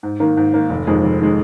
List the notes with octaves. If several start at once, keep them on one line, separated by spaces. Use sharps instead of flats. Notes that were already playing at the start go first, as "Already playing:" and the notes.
G#2
D#3 A#3
G#2
D#3 A#3
F1
F2 D#3 G#3
F1
D#3 G#3